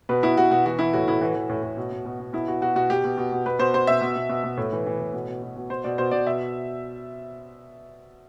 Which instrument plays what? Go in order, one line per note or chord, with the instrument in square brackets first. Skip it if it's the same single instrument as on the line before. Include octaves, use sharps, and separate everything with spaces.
[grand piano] B2 B4
B2 E4
B2 F#4
B2 F#4
E3 F#4
E3 E4
A2 F#4
A2 E4
E3 F#4
E3
A2
A2
B2
B2
B2
B2
B2 E4
B2 F#4
B2 F#4
B2 F#4
B2 G4
B2
B2
B2
B2 B4
B2 C5
B2 C5
B2 E5
B2
B2
B2
B2
A2
E3
E3
A2
B2
B2
B2
B2
B2 C5
B2 D5
B2 C5
B2 D5
B2 E5